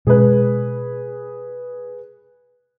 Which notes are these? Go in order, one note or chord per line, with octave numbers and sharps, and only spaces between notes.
B2 G#3 G#4 B4